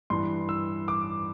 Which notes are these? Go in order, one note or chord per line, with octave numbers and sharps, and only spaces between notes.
G2 E3 C6
E6
D6